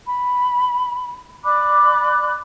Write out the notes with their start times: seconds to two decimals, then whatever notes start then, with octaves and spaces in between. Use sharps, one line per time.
0.06 B5
1.43 D5 B5 D6 F#6